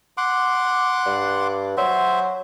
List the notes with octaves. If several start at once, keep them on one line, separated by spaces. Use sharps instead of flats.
F#5 C6 D6
G2
F#3 C5 E5